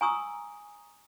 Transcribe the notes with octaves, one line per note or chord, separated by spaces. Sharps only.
G#5 A#5 C#6 D#6 E6